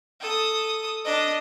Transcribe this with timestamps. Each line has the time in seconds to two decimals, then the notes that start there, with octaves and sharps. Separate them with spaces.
0.21 A4 D#6
1.05 D4 D#5